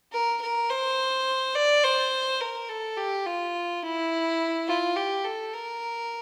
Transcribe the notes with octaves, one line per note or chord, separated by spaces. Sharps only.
A#4
A#4
C5
D5
C5
A#4
A4
G4
F4
E4
F4
G4
A4
A#4